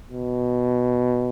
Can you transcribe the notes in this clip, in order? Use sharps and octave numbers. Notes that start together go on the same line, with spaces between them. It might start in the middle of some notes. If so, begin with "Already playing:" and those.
B2